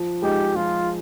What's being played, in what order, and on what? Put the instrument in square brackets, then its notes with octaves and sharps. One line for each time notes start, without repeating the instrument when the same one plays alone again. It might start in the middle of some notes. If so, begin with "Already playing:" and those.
Already playing: [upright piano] F3
[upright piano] G#3 D#4 G#4 [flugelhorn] G4
[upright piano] F3 [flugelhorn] F4